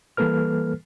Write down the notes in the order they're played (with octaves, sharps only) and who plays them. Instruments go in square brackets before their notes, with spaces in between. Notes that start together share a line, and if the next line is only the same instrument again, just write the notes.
[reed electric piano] E3 G3 A#3 A4 B4 F6